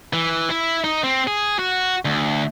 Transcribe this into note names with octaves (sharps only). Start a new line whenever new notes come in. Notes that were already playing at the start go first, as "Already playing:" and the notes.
E3
E4
D#4
C4
G#4
F#4
D2